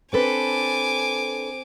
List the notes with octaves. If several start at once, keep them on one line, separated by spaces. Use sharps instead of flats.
C4 D4 A4 B4 G#5 D6